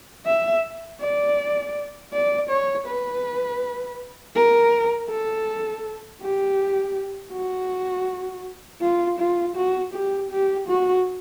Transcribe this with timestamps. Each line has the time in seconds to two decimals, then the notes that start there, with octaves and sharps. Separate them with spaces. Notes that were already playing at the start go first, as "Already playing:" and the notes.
0.26 E5
1.01 D5
2.13 D5
2.50 C#5
2.87 B4
4.36 A#4
5.10 A4
6.21 G4
7.33 F#4
8.81 F4
9.19 F4
9.56 F#4
9.93 G4
10.31 G4
10.67 F#4